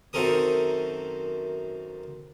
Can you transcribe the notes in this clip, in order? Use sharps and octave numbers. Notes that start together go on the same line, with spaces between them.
F#2 D#3 C4 A4 A#4 D#6